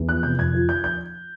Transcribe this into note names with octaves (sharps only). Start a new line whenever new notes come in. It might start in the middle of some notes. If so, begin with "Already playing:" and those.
Already playing: E2
F3 F#6
C3 G6
F2 G#6
F3
F3 G6
G6